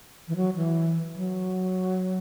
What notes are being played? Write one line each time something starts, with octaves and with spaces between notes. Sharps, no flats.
E3
F#3
E3
E3
F#3